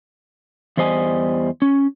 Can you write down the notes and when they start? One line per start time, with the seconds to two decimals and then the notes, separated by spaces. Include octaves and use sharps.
0.77 E2 G3 C5 D#5 G#5
1.62 C#4